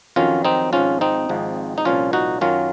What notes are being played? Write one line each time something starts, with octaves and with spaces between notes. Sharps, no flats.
F2 D#3 F#3 C#4 F4
C4 D#4
G#1 G#2 F3 C#4 F4
C4 D#4
G#1 G#2 F3
D#4
C2 A#2 F3 C#4 F4
D#4 F#4
F#2 D#3 F#3 C#4 F4